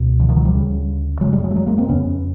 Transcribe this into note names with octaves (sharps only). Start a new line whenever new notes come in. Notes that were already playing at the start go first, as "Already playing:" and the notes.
Already playing: C#2 B2
D3 E3
D#3 F3
E3 F#3
F3 G3
D2 C#3
F#2 F#3 G#3
C#3
G3 A3
F#3 G#3
A3
F#3 G#3
G#3 A#3
A#3 C4
F2 C#3 B3 C#4